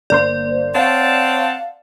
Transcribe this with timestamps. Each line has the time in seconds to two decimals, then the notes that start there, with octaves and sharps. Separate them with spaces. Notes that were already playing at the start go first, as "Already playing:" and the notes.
0.10 G1 A#3 C5 D5
0.75 C4 C#5 F5 F#5 A5